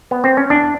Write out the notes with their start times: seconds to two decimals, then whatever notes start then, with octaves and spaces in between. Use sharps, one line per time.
0.11 B3
0.24 C4
0.37 C#4
0.50 E2 D4